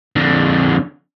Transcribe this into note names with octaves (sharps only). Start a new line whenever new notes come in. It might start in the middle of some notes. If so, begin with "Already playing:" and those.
F2 D3